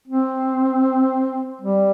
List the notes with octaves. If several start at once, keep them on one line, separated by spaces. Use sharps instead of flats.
C4
G3